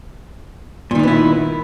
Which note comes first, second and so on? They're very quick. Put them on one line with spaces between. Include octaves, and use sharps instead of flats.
A#2 D#3 D#4 B3 E4